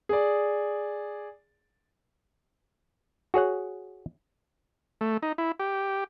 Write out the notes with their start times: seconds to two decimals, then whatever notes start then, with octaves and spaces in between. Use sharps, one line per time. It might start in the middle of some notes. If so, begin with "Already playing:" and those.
0.09 G#4 D5
3.34 F#4 G#4 C#5 F#5
5.01 A3
5.23 D#4
5.38 E4
5.59 G4